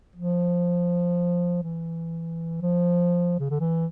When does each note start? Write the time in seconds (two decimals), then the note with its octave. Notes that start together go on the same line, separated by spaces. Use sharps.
0.16 F3
1.63 E3
2.62 F3
3.40 C#3
3.50 D3
3.60 E3